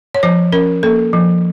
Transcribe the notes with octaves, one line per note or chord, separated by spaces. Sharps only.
C#5
F3 C5
C#4 A#4
A#3 A4
F3